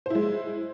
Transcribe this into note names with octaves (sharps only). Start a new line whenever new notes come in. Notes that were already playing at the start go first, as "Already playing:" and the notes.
G#3 E4 C5